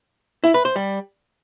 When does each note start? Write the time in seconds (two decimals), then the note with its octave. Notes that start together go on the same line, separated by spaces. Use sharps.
0.44 E4
0.54 B4
0.65 C5
0.76 G3